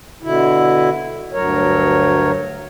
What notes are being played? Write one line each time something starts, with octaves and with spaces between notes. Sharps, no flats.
B2 D3 E4
D2 G2 F#3 A#4 C#5